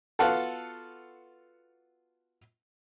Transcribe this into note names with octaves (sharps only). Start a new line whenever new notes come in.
B3 F4 F#4 A4